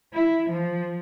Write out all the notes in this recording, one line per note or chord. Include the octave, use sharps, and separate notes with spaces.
E4
F3